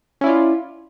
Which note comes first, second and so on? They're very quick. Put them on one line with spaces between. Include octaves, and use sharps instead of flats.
C#4 E4 D5 F4